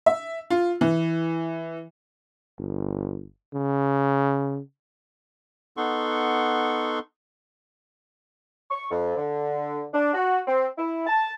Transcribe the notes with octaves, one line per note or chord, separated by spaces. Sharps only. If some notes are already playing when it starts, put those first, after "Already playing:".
E5
F4
E3
G1
C#3
B3 D#4 A4 F#5 C6 C#6
C#6
F2
D3
D4
F#4
C4
E4
A5